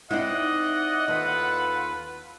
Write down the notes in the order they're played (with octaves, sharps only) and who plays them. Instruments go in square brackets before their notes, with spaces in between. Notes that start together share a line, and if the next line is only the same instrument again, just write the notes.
[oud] C4 D#4 E4 [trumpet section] D5 D#5 [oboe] F#5
[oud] D#2 [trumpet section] F4 A4 B4